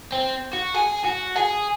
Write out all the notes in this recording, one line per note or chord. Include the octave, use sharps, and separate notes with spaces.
C4
F#4
G#4
F#4
G#4